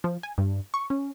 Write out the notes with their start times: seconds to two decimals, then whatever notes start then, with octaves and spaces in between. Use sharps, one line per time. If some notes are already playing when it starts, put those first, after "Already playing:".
0.04 F3
0.23 G#5
0.38 G2
0.74 C#6
0.90 C#4